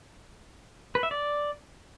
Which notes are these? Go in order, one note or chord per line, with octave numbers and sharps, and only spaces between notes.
B4
E5
D5